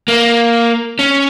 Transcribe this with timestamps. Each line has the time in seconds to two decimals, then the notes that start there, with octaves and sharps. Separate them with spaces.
0.08 A#3
0.99 C#4